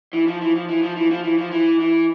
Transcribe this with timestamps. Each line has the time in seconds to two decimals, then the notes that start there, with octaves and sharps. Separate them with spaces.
0.13 E3
0.27 F3
0.41 E3
0.55 F3
0.68 E3
0.83 F3
0.96 E3
1.10 F3
1.24 E3
1.38 F3
1.51 E3
1.80 E3